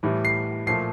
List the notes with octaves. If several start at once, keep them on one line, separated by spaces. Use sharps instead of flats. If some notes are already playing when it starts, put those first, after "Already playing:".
A2 E3 G3
C7
A#2 F3 A3 C7